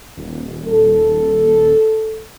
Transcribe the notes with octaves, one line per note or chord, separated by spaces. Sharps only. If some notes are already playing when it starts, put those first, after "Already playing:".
D#1
A4